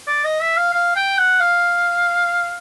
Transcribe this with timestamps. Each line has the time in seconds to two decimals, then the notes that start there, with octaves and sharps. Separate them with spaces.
0.07 D5
0.24 D#5
0.41 E5
0.57 F5
0.74 F5
0.96 G5
1.18 F#5
1.40 F5